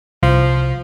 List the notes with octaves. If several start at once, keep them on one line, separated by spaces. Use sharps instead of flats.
C2 F3